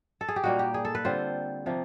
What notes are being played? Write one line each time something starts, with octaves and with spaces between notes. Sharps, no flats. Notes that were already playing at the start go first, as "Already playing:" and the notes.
A4
G#4
G4
A#2 G3 A#3 D#4 F#4
G4
G#4
A4
B4
D3 G3 C4 F4 C5
C3 F3 A#3